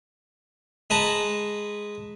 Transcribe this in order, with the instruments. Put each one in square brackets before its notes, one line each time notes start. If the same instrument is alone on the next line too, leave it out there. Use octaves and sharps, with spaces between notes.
[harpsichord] G#3 B4 A5 A#5